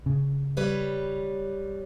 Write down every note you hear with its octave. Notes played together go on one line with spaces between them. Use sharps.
C#3
G3 B4 C#5